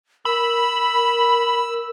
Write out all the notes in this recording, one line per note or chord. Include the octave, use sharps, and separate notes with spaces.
A#4 B5 E6